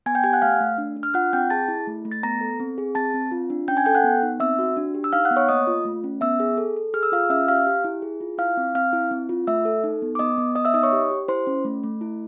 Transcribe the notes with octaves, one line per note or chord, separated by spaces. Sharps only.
B3 G#5 G#6
G5 G6
G4 G#5 G#6
F#5 F#6
A3 F5 F6
A3
D4
D4
F6
F4 F#5 F#6
C4 G5 G6
G#4 A5 A6
E4
A3
A3
A6
B3 A#5 A#6
A4
C4
G#4
C4 A5 A6
C4
F4
D4
C#4 G5 G6
G#5 G#6
A4 G5 G6
F#5 F#6
B3
D#4
C4 E5 E6
F#4
D4
G4
E6
D#4 F5 F6
F#5 F#6
B3
C#5 C#6
A#3 D#5 D#6
F4
A3
C#4
B3 E5 E6
G#4
A4
A4
G#4 F6
E6
F4 F5 F6
C#4 E5 E6
G4 F5 F6
G4
E4
G#4
F4
E4 F5 F6
C4
C4 F5 F6
E4
C4
F4
A3 E5 E6
A4
D#4
B3
D6
B3 D#5 D#6
B3
B3 D#5 D#6
E5 E6
D#4 D#5 D#6
C#5 C#6
G4
G4
E4 C5 C6
C#4
A3
A3
E4